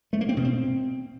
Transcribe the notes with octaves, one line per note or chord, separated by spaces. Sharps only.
A3
A#3
C4
B2
C4